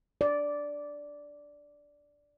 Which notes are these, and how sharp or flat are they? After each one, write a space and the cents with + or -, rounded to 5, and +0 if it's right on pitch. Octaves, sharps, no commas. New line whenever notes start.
D5 -10